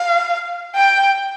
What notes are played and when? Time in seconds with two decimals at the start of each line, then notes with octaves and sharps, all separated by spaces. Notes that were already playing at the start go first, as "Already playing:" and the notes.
Already playing: F5
0.75 G5